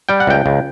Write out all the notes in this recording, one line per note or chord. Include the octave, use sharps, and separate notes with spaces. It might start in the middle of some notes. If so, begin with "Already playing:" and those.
G3 G5
F#5
C#2 G5
C#2